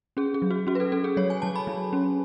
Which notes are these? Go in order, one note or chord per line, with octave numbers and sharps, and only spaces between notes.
C#4 G#4
G#4
F#3
F#4
C#4 F#4
B4
A4
C#4 A4
G#4
F#3 C#5
G#5
F#3 A5
B5
F#3
C#4